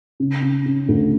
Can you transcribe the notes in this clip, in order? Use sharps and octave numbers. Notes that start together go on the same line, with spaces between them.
C#3
C#3
C#3
D2